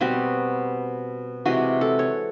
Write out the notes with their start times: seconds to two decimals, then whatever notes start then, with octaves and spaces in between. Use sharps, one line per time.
0.01 B2 G3 C4 F#4
1.46 C3 E3 G#3 F#4
1.81 A4
1.99 C#5